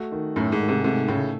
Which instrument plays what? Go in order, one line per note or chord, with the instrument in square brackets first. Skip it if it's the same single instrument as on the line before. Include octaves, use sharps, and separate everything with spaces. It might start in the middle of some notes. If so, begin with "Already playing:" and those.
Already playing: [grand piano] A3 F#4
D#3
[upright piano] F#2 A2 [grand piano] A3
[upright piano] G#2
[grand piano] D#3
[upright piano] G#2 C3
[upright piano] G#2 C3 [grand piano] A3
[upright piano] A2 C#3 [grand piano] A3